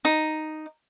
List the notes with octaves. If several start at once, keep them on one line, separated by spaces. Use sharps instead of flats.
D#4